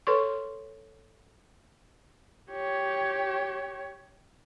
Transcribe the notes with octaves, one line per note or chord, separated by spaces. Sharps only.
A4 B4 C#5 C6 C#6
G4 C#5